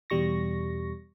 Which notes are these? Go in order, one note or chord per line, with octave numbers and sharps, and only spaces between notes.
E2 B2 G3 C#6 A#6